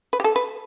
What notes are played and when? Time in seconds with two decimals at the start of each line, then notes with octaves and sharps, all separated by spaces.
0.13 B4
0.20 G4
0.24 A4
0.36 B4